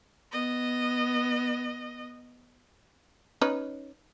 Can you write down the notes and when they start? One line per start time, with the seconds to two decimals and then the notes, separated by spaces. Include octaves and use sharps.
0.32 B3 D#5
3.42 C#4 D#4 B4